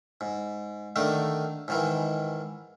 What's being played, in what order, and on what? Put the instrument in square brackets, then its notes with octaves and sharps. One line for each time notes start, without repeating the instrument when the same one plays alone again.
[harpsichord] G#2
D3 D#3 A3
G#2 D#3 E3